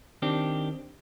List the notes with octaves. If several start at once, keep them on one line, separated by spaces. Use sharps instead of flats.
D#3 C4 D4 G4